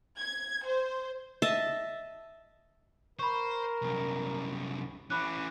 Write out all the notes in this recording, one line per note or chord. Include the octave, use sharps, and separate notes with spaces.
G#6
C5
D#5 E5 A5
A#4 C5 B5 C#6
C2 F#2
E3 C#4 B5 D6 F#6